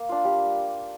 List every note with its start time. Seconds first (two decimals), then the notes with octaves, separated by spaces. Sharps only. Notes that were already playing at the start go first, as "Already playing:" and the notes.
Already playing: A#3
0.09 D4 F4
0.25 G3